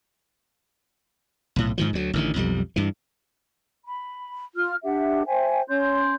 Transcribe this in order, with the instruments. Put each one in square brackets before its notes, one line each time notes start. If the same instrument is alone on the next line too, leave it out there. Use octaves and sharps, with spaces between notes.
[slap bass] B1 A2
G#2 D#3 F3
D2 F#3
A1 D3 D#3
B1 F2 G3
G2 E3
[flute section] B5
F4 F6
D4 G4 E5 F#5
C5 E5 G5 G#5
C#4 C#5 C6 G6